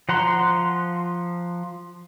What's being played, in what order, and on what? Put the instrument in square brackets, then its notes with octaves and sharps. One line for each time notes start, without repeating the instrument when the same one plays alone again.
[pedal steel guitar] F3 F#5 A#5 C6